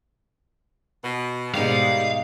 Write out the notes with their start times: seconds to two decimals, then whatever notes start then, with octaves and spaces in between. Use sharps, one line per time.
1.03 B2
1.54 G#2 B2 D#3 G3 G#3 F5